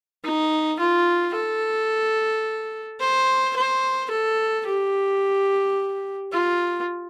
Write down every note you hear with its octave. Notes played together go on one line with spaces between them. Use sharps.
D#4
F4
A4
C5
C5
A4
G4
F4